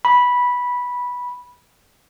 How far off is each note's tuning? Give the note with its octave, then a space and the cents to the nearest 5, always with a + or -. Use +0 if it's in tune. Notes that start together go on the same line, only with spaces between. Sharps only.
B5 -10